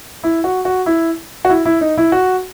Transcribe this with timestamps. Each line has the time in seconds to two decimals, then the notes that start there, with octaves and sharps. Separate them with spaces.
0.24 E4
0.44 F#4
0.65 F#4
0.86 E4
1.45 F#4
1.50 E4
1.66 E4
1.81 D#4
1.98 E4
2.12 F#4